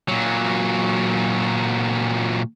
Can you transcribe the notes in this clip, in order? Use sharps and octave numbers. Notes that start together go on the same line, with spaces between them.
A#2 F#3